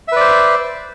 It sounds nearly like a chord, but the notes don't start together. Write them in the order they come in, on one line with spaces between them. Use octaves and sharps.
E5 B4 D5 C5